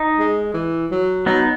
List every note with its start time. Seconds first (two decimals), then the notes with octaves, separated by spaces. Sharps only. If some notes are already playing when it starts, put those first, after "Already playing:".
Already playing: D#4
0.18 G#3
0.54 E3
0.91 F#3
1.26 F#3 B3 D#4